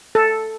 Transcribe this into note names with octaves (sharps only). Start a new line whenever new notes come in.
A4